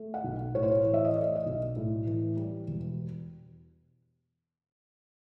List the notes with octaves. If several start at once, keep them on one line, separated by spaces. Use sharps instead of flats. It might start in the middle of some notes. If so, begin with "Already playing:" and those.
Already playing: A3
F#5
B1
A2 C#5
C5
C#5
E3
E5
D#5
A3 D5
D#5
B1
A2
E3
G3
E1